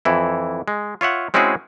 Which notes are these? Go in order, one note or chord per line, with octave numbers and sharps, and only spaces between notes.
F2 E3 E4
G#3
F4 C#5 E5 F#5
G#3 C4 C#4 E4 F#4 G#4